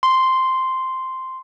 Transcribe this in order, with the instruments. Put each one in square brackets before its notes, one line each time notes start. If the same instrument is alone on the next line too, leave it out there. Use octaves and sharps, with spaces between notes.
[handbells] C6